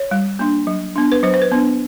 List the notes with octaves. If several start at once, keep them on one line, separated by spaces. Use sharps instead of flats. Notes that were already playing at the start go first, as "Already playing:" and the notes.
Already playing: C#5
G3
A#3 D4
F#3
B3 D4
B4
F#3 C5
C5
B4
B3 D4